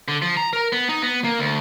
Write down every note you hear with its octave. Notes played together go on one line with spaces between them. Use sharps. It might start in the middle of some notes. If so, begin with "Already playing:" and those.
D3
F3
A#5
A#4
B3
D#4
B3
A#3
D2